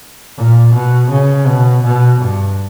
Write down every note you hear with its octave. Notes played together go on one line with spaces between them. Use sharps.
A#2
B2
C#3
B2
B2
G2